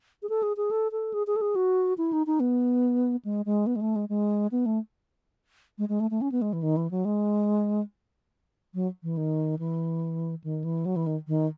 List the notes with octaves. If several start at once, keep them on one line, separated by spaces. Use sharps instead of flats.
G#4
A4
G#4
G#4
A4
A4
G#4
G#4
A4
G#4
F#4
E4
D#4
D#4
B3
G#3
G#3
B3
G#3
A3
G#3
G#3
B3
A3
G#3
G#3
A3
A3
C#4
B3
G#3
E3
D#3
E3
F#3
G#3
F#3
E3
D#3
E3
D#3
E3
F#3
E3
D#3
D#3